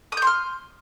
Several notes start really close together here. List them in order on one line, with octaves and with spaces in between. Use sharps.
D#6 G6 C6 F6